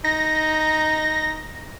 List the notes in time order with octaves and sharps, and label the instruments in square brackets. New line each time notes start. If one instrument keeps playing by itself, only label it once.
[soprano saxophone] D#4 [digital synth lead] A#6